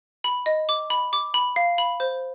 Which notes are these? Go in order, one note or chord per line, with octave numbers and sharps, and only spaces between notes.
B5
D#5
D6
B5
D6
B5
F5
B5
C5